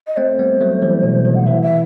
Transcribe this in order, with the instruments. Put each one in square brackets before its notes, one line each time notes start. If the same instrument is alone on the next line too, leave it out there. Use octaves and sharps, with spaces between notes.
[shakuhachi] D#5
[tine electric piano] A3 C4 [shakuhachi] C5
[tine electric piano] G3 B3
F#3 A3
E3 G3
B2
B2 D#3
[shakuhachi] F#5
[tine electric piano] C3 E3 [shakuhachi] E5
[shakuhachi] E5